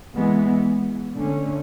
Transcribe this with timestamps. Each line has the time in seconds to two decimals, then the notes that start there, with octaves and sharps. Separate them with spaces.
0.14 E3 G#3 B3
1.14 D3 A3 C#4